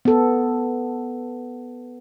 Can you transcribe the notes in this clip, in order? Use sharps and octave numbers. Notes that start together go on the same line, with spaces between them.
B3 A4